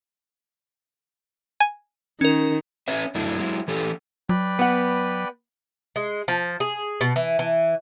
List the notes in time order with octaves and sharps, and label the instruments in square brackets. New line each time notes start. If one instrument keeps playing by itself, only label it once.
[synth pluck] G#5
[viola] D#3 [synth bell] C#4 A#4
[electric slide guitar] C#4 B4 C#5 E5
F#2 F#3 A3 D4 E4
F#3 G#3 E4
E3 A3 C#4 G4 A4
[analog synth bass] F#3 [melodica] B4 D5 G5
[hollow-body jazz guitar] B3 F#5
[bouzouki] G#3
F3
G#4
B2
E3
E3